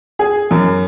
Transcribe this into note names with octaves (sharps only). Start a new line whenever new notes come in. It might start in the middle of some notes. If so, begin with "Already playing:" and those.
G#4
F#2